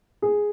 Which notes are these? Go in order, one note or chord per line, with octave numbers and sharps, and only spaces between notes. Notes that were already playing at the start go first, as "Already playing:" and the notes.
G#4